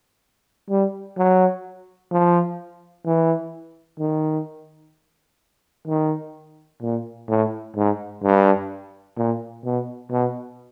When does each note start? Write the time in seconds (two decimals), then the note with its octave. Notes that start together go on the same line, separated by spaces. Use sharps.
0.70 G3
1.17 F#3
2.11 F3
3.06 E3
4.00 D#3
5.88 D#3
6.82 A#2
7.29 A2
7.76 G#2
8.23 G2
9.17 A#2
9.65 B2
10.12 B2